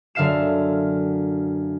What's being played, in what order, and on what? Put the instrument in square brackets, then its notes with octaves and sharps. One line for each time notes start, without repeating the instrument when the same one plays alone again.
[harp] F#2 D3 E5 F5 C7 E7